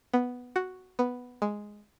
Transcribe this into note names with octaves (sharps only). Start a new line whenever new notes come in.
B3
F#4
B3
G#3